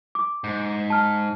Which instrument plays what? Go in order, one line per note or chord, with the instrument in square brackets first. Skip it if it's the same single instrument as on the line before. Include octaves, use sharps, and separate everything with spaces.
[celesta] D6
[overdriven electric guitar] G#2
[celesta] A5 F6